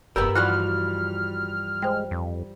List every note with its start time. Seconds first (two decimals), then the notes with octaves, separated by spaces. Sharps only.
0.16 F1 G2 B3 G4 A#4 E6 G6
0.35 E3 F3 G3 F#4 F6 F#6
1.82 G#3 C5 G5
2.11 F2